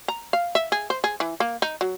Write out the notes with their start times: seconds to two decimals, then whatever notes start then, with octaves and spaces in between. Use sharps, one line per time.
0.08 A#5
0.33 F5
0.55 E5
0.72 G#4
0.90 C5
1.04 G#4
1.20 E3
1.40 A#3
1.62 D#4
1.81 F#3